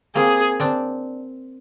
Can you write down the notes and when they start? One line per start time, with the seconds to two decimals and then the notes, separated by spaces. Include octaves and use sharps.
0.15 A#3 C4 G#4
0.60 C4 D4